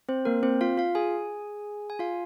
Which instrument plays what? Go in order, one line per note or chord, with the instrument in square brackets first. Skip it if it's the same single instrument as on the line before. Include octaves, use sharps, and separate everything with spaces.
[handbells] C4 C5
A#3 A#4
C4 C5
F4 F5
F4 F5
G#4 G#5
G#5
F4 F5